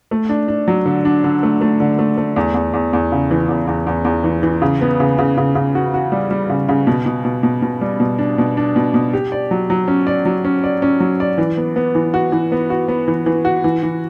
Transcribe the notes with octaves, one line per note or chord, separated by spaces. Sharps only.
A3
D4
D4
F#3
D3
D4
D3
A3
A3
D3
A3
A3
E2
E2
E2
E2
C#3
E3
E2
E2
E2
E2
E3
E3
C#3
B3
C#3
C#3
C#3
C#3
F#4
F#4
G3
G3
C#3
C#3
B2
B2
B2
B2
B2
G3
B2
D4
B2
D4
B2
B2
G4
D5
F#3
F#3
C#4
D5
F#3
C#4
D5
C#4
F#3
D5
E3
B3
B3
E3
F#4
E3
B3
F#4
B3
E3
E3
F#4
E3
E3